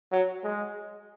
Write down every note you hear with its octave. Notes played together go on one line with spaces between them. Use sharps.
F#3
G#3